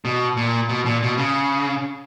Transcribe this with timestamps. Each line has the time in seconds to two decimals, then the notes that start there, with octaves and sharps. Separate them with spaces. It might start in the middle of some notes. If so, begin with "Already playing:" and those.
0.05 B2
0.37 A#2
0.69 B2
0.86 A#2
1.02 B2
1.18 C#3